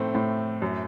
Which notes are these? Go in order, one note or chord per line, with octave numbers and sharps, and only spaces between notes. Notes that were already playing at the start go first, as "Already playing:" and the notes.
Already playing: A2 A3 C4
A2
F#2